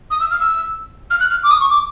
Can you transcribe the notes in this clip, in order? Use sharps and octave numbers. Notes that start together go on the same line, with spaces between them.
D#6
E6
F6
E6
F6
F#6
F6
D6
D#6
C#6
D6